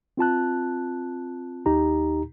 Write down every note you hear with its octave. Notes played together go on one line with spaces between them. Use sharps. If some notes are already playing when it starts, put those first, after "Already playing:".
C4 F4 A5 F#6
D#2 D#4 G4 A#5